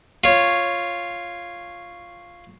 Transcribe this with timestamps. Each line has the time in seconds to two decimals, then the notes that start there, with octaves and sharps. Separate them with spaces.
0.24 F4 C#5